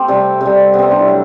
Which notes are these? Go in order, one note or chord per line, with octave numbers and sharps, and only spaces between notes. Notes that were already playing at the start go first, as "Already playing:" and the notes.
Already playing: A3 C4 G4
C3 G3
C3 G3
C3 B3
G3 C4
D4
E4
F#3 A3